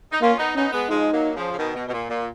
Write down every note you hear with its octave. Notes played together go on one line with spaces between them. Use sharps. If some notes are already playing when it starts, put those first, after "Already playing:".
D#4
A#3 C#4 F4
B3 D#4
B3 C#4 D#4
G#3 B3
F3 G#3 D#4
F#3 A#3
C#3 F3
C#3
B2 D#3
B2
B2
A#2
A#2